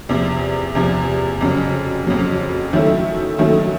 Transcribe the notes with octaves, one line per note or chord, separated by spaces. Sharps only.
E2 C3 F3
E2 C3 F3
F2 C#3 F#3
F2 C#3 F#3
D#3 F#3 A3 C#4 E4
D#3 F#3 A3 C#4 E4